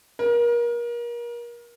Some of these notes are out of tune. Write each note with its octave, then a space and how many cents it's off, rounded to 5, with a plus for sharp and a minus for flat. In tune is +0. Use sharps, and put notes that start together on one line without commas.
A#4 +30